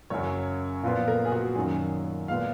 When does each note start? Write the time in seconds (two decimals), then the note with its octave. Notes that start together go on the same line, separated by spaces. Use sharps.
0.10 F#2 C#3 F#3 C#4 C#5
0.83 A#2 F3 B3 F4
1.08 A#4
1.25 G#4
1.32 F#4
1.55 F#2 D#3 F#3 C#4 G#4
2.28 A#2 G#3 B3 F4 F5